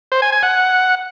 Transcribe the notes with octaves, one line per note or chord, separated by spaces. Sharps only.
C5
G#5
G#5
F#5